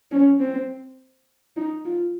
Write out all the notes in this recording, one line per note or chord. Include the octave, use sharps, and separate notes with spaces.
C#4
C4
D#4
F4